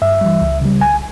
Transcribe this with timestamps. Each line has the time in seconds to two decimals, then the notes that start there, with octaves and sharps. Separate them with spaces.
0.02 G2 E5
0.21 E3 G3
0.41 C#2
0.61 C#3 G3
0.81 C2 G#5